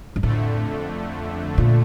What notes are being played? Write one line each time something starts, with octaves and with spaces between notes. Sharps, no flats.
G2
F2 A2 D3 A3
A#2